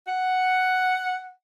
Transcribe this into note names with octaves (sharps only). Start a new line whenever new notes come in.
F#5